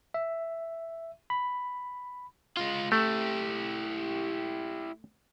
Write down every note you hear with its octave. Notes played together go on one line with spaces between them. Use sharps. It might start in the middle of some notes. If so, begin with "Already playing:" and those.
E5
B5
G#3 F4
A3 E4 G4